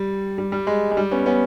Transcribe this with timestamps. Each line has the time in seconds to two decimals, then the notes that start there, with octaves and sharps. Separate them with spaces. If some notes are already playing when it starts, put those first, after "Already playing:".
Already playing: G3
0.38 G3
0.52 G3
0.67 G#3
0.91 G#3
0.97 G3
1.11 B3 C#4
1.26 B3 C#4